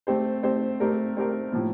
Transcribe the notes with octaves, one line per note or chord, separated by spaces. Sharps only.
A3 C4 G4 C5
A3 C4 G4 C5
A3 C4 G4 A#4
A3 C4 G4 A#4
A2 F3 A#3